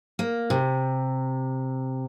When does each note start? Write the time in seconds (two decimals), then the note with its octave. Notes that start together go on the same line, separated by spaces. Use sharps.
0.19 A#3
0.50 C3